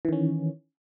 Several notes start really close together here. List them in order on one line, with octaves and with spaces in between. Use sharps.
E3 D#3 C#4